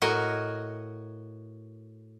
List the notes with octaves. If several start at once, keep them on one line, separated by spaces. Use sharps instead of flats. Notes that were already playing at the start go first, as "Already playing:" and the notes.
A2 F#4 A#4 D#5 G#5